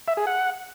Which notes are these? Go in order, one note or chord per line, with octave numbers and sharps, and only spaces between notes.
E5
G#4
F#5